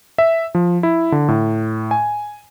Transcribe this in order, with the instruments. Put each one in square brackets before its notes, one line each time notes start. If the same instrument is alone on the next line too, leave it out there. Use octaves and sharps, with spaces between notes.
[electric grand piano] E5
F3
E4
D3
A2
G#5